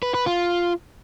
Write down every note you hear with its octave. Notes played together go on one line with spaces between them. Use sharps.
B4
B4
F4